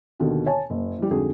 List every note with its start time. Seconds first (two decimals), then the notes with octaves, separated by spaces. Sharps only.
0.20 D#2 B2 D3 D#3
0.46 C#5 G#5 A5
0.70 F#1
0.98 E3 G3
1.11 F2 G#2 D3 F#4 G#4